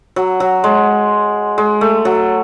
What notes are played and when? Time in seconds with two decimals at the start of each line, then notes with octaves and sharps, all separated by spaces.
0.16 F#3
0.40 F#3
0.64 G#3
1.58 G#3
1.81 A3
2.05 F#3